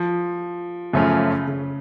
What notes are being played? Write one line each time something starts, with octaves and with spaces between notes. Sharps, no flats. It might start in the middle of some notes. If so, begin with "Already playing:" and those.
Already playing: F3
F#2 C#3 F3 A3 C#4 F4
C#3